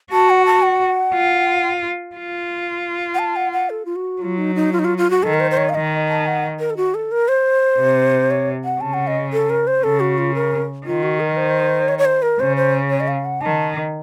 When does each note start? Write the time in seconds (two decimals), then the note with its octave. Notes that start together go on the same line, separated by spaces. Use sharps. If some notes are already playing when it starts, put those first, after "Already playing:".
0.12 F#4 A5
0.30 F#5
0.46 A5
0.64 F#5
1.14 F4
2.16 F4
3.14 F#5
3.19 A5
3.36 F#5
3.53 F#5
3.70 A4
3.85 F4
3.96 F#4
4.22 F#3 F4
4.38 D#4
4.56 D#4
4.73 F4
4.79 D#4
4.85 F4
4.98 F4
5.10 F#4
5.23 D#3 A4
5.34 A#4
5.40 C5
5.51 C5
5.57 C#5
5.69 F5
5.74 D#3 D#5
6.08 A5
6.26 F#5
6.59 A#4
6.70 A4
6.77 F#4
6.95 A4
7.12 A#4
7.28 C5
7.79 C3
8.31 C#5
8.65 F#5
8.81 C#3 A5
8.94 F#5
9.07 D#5
9.33 A4
9.50 A#4
9.67 C5
9.84 C#3 A4
10.00 F#4
10.18 F4
10.35 A#4
10.86 D#3 F4
11.03 F#4
11.20 A#4
11.37 C5
11.88 C#5
11.99 C#5
12.05 C5
12.22 A#4
12.40 C#3 C5
12.57 C5
12.90 C#5
13.00 D#5
13.08 F5
13.25 F#5
13.41 D#3 A5